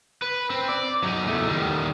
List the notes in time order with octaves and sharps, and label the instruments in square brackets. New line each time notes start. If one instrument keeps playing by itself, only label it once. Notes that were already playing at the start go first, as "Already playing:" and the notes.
[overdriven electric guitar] B4
C4
D5
F#3 D#4
E2 A3
D#3 G3